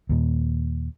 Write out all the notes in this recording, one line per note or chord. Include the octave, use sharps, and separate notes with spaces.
D#2 A#2